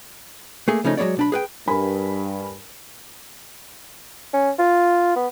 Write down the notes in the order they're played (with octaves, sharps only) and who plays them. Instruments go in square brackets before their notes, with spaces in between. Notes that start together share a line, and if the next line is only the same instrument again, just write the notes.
[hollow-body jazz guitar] A3 A#3 G#4
C#3 F3 A3 C#4 D#4
F#3 G#3 C4 C#5 D5
B1 D4 B5
G#4 B4 G5
[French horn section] G2 [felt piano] A#4 G#5 B5
[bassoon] C#4
F4
B3